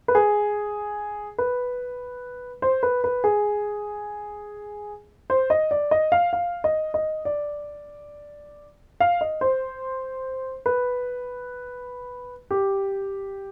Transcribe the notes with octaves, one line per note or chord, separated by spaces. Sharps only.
B4
G#4
B4
C5
B4
B4
G#4
C5
D#5
D5
D#5
F5
F5
D#5
D#5
D5
F5
D#5
C5
B4
G4